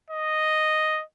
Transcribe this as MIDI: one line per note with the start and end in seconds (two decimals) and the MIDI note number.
0.10 1.02 75